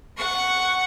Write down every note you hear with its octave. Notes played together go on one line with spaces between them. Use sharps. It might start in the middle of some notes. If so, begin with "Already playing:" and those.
F#5 C#6